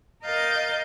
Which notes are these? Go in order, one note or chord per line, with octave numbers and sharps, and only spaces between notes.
A#4 D#5 F5 G6 A6